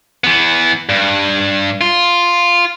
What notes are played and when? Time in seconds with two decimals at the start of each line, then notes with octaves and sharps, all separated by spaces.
0.24 E3 B3
0.89 G2
1.81 F4